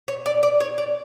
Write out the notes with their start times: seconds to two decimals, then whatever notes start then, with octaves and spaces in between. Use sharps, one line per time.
0.08 C#5
0.26 D5
0.43 D5
0.60 C#5
0.78 D5